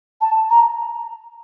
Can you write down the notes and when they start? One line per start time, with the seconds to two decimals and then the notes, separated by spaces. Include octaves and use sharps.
0.21 A5
0.50 A#5